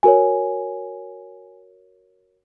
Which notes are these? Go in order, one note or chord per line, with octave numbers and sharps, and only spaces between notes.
F#4 A#4 C#5 G#5